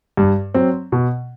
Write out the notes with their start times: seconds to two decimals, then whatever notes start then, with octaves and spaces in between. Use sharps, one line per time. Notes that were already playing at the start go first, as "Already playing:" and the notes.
0.17 G2
0.54 F#3 C4
0.92 B2